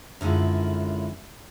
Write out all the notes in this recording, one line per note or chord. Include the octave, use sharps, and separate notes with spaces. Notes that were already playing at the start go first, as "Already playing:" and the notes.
F#2 D3 G#3 E4 F4